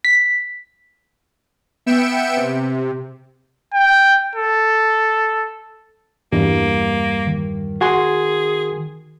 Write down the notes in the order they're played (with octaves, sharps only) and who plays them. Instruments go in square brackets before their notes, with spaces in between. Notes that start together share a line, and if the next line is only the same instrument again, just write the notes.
[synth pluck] B6
[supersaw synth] B3 E5 G5 C#7 D7 E7
C3
[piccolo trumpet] G5
A4
[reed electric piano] E2 G2 G3 [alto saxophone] A#3
[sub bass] D#3
[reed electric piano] F#4 G#5 C6 [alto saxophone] G#4